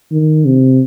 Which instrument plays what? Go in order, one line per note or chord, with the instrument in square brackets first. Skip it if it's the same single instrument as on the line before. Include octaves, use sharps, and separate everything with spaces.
[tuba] D#3
C3